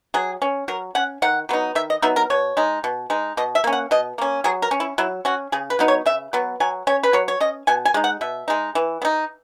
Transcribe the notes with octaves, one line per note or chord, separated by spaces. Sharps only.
F#3 G#4
C#4
F#3 A#4
C#4 F#5
D#3 F#5
F#3 B3 D#4
D#3 E5
D#5
F#3 B3 D#4 E5
A#4
B2 C#5
G#3 D#4
B2
G#3 D#4
B2 D#5
E5
A#3 C#4
F#5
B2 D#5
A#3 C#4
F#3 G#4
A#4
C#4
E4
F#3 E4
C#4 F#4
C#3 G#4
B4
F#3 B3 D#4
C#5
C#3 E5
F#3 B3
F#3 G#5
C#4 C#5
B4
F#3 C#5
C#5
C#4 D#5
B2 G#5
G#5
G#3 D#4
F#5
B2 E5
G#3 D#4
E3
B3
D#4